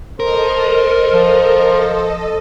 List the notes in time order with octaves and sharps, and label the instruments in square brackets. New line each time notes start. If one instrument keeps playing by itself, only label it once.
[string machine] A4 D#5 [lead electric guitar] A#4 [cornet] C5
[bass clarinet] F3